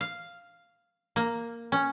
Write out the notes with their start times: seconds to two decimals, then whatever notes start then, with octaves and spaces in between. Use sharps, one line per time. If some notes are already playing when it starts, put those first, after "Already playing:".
0.01 F5
1.16 A#3
1.72 C#4